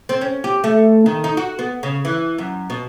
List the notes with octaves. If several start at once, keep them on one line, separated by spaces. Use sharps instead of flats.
C4
C#4
G4
A3
D#3
D#4
F#4
B3
C#3
E3
F#2
B2